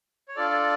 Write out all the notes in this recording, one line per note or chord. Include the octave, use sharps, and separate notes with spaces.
C#5
D4 F4 A4 D5